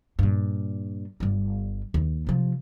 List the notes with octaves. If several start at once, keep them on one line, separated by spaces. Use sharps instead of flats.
G2 A#2
G1 G3
D#2
C3 F3